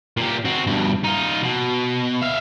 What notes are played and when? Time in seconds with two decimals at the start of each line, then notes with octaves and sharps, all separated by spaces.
0.17 A#2 G4
0.45 C4 F#4
0.67 G2 B2
1.04 D#4 F4
1.43 B2
2.21 E5 F5